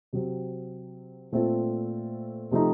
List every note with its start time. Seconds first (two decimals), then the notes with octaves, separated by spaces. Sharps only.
0.13 C3 F#3 C4
1.32 A#2 A3 C4 F4 A4
2.51 C3 F3 A3 C4 D#4